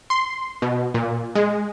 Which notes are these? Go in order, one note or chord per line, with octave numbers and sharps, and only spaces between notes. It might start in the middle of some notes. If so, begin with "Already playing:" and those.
C6
B2
A#2
G#3